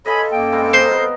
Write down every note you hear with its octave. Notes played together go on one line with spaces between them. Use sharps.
A4 C#5 D#5 F5 G#5 B5 C6
F#2 A#3 G5
G3 G#3 C4
A#4 C5 D#5 A#5 C6
B3 F4 A#4